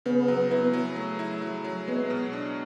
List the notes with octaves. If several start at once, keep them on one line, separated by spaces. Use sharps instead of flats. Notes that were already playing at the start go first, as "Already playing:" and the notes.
C#3 B3
F#3
E4
F#3
A3
E4
F#3
F#3
G#3 B3
B2
D4